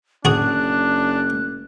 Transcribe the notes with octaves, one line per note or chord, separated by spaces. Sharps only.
F#1 D4 F#4 G#4 F#6